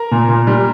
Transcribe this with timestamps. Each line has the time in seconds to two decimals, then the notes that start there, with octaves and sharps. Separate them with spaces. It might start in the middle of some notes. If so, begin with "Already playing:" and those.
Already playing: A#4 A#5
0.11 A#2
0.29 A#2
0.47 G3